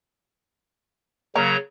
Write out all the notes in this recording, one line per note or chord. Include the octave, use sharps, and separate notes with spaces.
C#3 F#3 A#3 A#4 C#5 A#5